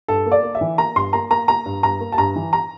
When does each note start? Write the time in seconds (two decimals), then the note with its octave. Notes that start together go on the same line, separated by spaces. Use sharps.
0.08 G2 A4
0.26 A#3
0.32 D5
0.43 A#3
0.55 E5
0.61 E3
0.78 A#3 A#5
0.96 G2 C6
1.13 A#3 A#5
1.31 A#3 A#5
1.48 A#3 A#5
1.66 G2
1.83 G2 A#5
2.00 A#3
2.12 A5
2.18 G2 A#5
2.36 E3
2.53 A#5